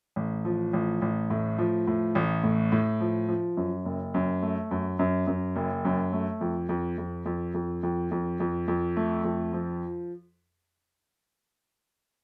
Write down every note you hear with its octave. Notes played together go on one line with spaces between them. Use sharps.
A1
F3
A1
A1
A2
F3
A2
A1
A2
A2
F3
F3
F#2
F#1
F#2
A3
F#2
F#2
F#2
F#1
F#2
A3
F2
F2
F2
F2
F2
F2
F2
F2
F2
A3
F2
F3